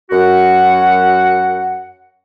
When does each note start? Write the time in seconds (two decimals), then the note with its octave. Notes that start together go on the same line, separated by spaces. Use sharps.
0.11 F#2 F#4 F#5